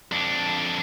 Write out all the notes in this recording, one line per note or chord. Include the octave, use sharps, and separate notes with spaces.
F2 D4